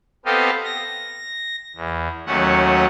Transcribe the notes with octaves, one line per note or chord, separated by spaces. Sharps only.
B3 C4 G4 A4 D#5 F5
A#6
E2
D#2 F#3 A3 C#4 F#5